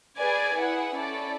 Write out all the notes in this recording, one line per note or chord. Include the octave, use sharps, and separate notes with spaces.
G#4 B4 D5 G#5
E4 G#4 B4 F#5
C#4 E4 A4 D5